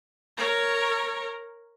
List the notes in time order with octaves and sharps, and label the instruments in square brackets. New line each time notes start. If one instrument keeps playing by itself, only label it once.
[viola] A#4 C#5